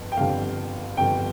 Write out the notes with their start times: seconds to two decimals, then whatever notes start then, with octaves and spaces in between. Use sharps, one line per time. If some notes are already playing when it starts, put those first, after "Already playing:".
Already playing: G1 F2
0.12 G5
0.17 G1 F2 D3 G3 F5
0.97 G1 F2 D3 G3 G5